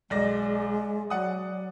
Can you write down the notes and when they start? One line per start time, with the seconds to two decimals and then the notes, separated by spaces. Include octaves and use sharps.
0.10 B1 G#3 D5 A#6
1.10 F#3 D5 F#5 D#6